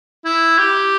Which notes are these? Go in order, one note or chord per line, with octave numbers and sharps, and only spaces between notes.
E4
G4